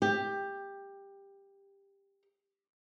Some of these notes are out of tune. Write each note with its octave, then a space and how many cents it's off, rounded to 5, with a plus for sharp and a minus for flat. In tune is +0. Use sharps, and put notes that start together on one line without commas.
G4 +15